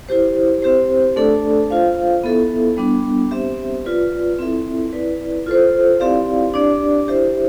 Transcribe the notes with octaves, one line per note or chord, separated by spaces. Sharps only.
E4 G4 C5
C4 G4 C5
A3 D4 A4 D5
F4 C5 F5
B3 E4 A4 E5
G3 B3 D4
C4 G4 C5 E5
F4 B4 D5
C4 E4 A4 E5
E4 B4 D5
F4 A4 C5
C4 E4 G4 D5 F5
D4 G4 D5
E4 G4 C5 E5